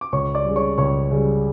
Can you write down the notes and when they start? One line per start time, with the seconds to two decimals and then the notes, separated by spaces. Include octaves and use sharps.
0.01 D6
0.12 C#2 C#5 C#6
0.35 D5 D6
0.45 C#3 G3
0.56 C#5 C#6
0.78 C#2 C#5 C#6
1.11 C#3 G3